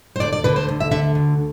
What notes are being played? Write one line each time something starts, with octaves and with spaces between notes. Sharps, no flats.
C5
D2 D5
D5
D3 B4
C5
D2
E5
D3 E5
D2